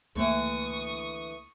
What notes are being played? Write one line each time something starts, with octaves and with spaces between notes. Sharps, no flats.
C#2 D3 E3 A3 A#3 C#6 D#6